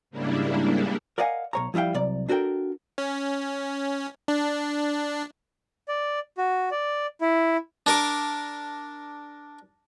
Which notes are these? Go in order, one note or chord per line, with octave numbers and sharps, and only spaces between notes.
G#2 C#3 G3 A#3 D4 E4
A#4 D5 D#5 F5 F#5 G#5
B1 C#5 A#5
F3 G3 E4 F5 G5
C2 F#3 D5
D4 F#4 A4 A#4 G5
C#4
D4
D5
F#4
D5
E4
D4 A#4 D6